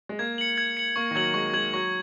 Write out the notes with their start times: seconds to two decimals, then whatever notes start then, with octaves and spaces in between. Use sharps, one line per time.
0.09 G#3
0.19 A#3 G#6
0.38 C#7 F#7
0.58 G#6
0.77 C#7 F#7
0.96 A#3 C#6
1.11 D#3
1.15 F#3 G#6 F#7
1.34 G#3 C#6
1.53 G#3 G#6 F#7
1.73 F#3 C#6